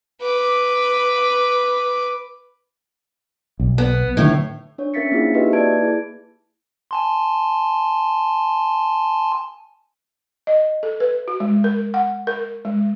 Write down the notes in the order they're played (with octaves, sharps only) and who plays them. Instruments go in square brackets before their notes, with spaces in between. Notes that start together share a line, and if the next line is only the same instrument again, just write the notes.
[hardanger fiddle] B4 D6
[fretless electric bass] B1
[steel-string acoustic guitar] B3
[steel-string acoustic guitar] A2 C#5 [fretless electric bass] D3 D#3 F#3
[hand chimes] D4 C#5
C#4 A#4 E5 A6 B6 C#7
A#3 C4 D4 E4 F4 G#4
D#4 F#4 G4 B4 D#5 E5
A#3 B4 D5 A5 G#6 D7
E4 G#4
[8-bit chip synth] G#5 A5 C6
[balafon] D#5
A4
B4
F#4
G#3
A#4
F#5
A#4
G#3